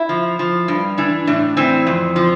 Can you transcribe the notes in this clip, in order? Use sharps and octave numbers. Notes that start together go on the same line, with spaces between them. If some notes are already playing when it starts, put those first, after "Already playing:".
Already playing: E4
F3
F3
G2
E3 D4
A2 D4
E3 C4
F2
F3